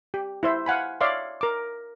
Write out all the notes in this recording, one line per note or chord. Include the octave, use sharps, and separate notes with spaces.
G4
E4 C5 E5
F5 F#5 G#5 B5
C#5 D5 E5 F5 C6
A#4 D6